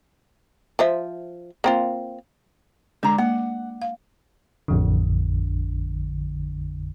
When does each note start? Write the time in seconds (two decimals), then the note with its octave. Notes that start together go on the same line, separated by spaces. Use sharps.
0.79 F3 C5 E5
1.64 A#3 C4 F4
3.03 D3 G#3 A#5
3.18 A#3 F#5
3.82 F5
4.68 A1 F2 D3